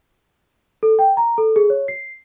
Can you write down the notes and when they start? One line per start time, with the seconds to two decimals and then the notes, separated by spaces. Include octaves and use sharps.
0.83 A4
0.99 G5
1.17 A#5
1.38 A4
1.56 G#4
1.70 C#5
1.88 C7